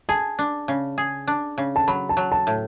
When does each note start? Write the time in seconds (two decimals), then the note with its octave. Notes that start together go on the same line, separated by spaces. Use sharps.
0.09 G#4 A5
0.39 D4
0.68 C#3
0.98 G#4
1.27 D4
1.58 C#3
1.76 A5
1.88 F#3 B5
2.09 A5
2.17 F#3
2.32 A5
2.47 A2